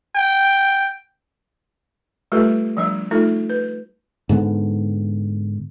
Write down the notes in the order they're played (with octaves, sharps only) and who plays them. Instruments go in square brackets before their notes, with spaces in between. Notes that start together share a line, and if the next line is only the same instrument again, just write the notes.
[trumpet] G5
[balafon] G3 A3 F4 G4 A4 B4
F3 G3 D4
A3 D#4 F4 A4
B4
[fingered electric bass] G#2 D3 B3